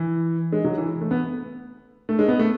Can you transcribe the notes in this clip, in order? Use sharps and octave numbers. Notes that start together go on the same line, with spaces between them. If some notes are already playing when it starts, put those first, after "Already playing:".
Already playing: E3
G#3
F#3
E3
A3
B3
A3
G#3
B3
A3